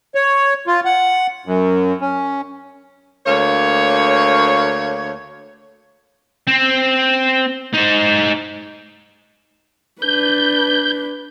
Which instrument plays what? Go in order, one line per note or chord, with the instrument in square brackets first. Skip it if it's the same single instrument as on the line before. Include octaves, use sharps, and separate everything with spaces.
[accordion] C#5
F4
F#5
F#2
C#4
[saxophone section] D2 A#3 C#5
[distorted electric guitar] C4
D#4 C5
[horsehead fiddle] D4 B4 [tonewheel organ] G6